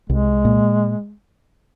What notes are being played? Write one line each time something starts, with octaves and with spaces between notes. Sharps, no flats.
C2 G#3
A#2